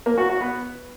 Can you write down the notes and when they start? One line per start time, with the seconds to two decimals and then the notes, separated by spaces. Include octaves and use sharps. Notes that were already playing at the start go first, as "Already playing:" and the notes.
0.06 A#3
0.18 F#4
0.29 F#4
0.41 B3